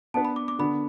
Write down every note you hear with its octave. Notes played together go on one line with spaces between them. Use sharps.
B3 D4 B4 A5
B5
D6
D6
D3 B3 D4 B5